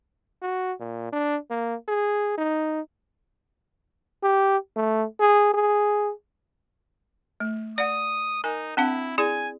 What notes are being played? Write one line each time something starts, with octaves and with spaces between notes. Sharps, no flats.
F#4
A#2
D4
A#3
G#4
D#4
G4
A3
G#4
G#4
A3
D5 F#5 D#6
D#4 A#4 G#5
C4 D4 E4 F#5
E4 G#4 D5 G#5